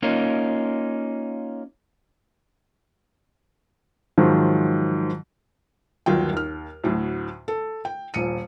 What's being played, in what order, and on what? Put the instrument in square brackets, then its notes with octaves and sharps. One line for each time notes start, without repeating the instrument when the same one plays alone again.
[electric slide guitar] A#3 C#4 D#4 F4
[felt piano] G#2 D#3 F3 F#3
G1 D#2 D#3 F#3 F4 G5
D#2 F6
D2 A2 F#3
A4
G5
D#1 A#1 C#7 D#7